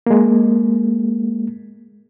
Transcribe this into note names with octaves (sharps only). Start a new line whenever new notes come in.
G#3 A#3